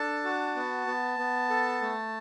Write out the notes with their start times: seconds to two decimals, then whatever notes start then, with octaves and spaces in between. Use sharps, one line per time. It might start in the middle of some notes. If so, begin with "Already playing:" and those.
Already playing: D4 A4 A5
0.24 F#4
0.56 B3
0.87 B3
1.18 B3
1.50 A4
1.82 A3